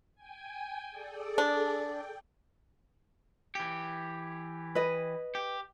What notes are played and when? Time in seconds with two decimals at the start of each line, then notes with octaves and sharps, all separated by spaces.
0.15 G5 G#5
0.91 G#4 A4 D5
1.38 D4
1.79 G5
3.55 E3 G4
4.75 B4 D#5
5.35 G4